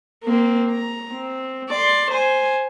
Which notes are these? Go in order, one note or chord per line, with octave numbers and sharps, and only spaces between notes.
A#3 C4
A#5
C4
D5 C6
C5 G#5